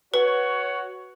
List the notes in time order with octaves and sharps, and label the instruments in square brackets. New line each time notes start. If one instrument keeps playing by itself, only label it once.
[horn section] F#4 C#5 [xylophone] B4